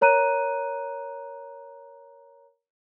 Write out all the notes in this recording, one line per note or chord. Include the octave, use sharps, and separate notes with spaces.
A#4 C#5 A#5 F#6 D#7